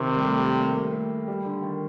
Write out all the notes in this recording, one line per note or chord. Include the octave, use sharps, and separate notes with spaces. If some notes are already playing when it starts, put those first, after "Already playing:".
Already playing: C3 D#3
G3
A3
A#3
A3
G3
D3
D#3